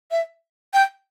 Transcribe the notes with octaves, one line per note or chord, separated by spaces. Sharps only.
E5
G5